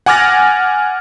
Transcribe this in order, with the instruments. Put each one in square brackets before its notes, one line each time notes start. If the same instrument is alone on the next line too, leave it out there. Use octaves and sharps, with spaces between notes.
[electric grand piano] F#5 G#5 D6 F6 A6 A#6